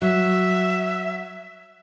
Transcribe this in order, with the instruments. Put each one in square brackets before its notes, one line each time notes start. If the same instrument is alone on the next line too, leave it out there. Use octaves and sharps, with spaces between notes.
[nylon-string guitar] F#3 [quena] E5